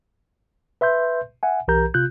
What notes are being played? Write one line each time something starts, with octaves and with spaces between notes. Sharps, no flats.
B4 E5 C6 G6
E5 F#5 G#5
B1 E3 G4 A#4 A#5 G6
C3 F4 F#6 G6